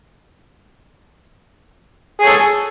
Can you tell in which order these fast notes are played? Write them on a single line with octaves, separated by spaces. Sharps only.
G#4 C#5 A4